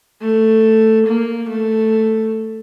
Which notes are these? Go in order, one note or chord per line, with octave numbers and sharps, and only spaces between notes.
A3
A#3
A3